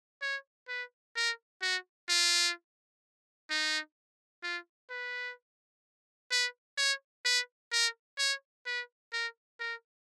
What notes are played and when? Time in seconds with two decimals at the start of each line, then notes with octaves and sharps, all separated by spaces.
0.22 C#5
0.68 B4
1.16 A#4
1.62 F#4
2.09 F4
3.50 D#4
4.43 F4
4.90 B4
6.31 B4
6.78 C#5
7.25 B4
7.72 A#4
8.18 C#5
8.66 B4
9.13 A#4
9.60 A#4